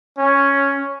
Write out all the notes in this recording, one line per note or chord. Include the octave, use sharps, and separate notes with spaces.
C#4